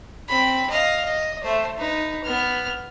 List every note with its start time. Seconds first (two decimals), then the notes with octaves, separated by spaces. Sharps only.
0.29 C4 B5
0.70 D#5 F5
1.05 D#5
1.43 A3 C5
1.77 D#4 B4
2.24 B3 F6